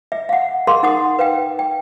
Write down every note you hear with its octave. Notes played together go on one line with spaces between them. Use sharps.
E5
F5 F#5
G#4 A#4 F5 C6
D#4 F#5 D#6
B4 F5 G5
G5